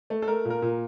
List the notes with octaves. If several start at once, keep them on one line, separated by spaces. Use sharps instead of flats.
A3
A4
A3 A#4
A#2
A#4
A#2